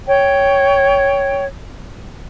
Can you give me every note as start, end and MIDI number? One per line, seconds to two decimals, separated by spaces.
0.08 1.44 73
0.08 1.44 79